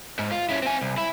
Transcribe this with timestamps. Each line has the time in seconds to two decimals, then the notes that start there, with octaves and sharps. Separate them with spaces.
0.19 G#2
0.31 F4
0.49 C#4 E4
0.62 C4 G#5
0.81 C2
0.98 E4